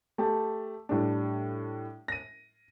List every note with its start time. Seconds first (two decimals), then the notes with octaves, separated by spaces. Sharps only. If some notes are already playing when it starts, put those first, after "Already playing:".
0.18 A3 G4 A5
0.89 A2 G3 D4
2.08 A#6 D#7